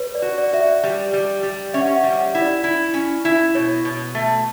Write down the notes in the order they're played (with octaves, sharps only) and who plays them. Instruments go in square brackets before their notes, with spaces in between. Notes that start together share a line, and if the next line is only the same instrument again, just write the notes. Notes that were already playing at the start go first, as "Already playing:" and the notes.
Already playing: [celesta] B4 C#5
D5
[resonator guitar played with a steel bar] F#4
[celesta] D5
[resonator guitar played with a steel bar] F#4 [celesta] E5
[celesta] D5
[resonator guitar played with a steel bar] G3
G3
G3
[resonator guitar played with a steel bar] C#4 [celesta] E5
[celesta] F#5
E5
F#5
[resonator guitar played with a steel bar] G3
[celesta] F#5
[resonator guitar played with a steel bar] E4
[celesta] D5
[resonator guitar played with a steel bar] E4
C#4
E4
[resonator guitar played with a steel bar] B2 [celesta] C#5
[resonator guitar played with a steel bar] B2
A3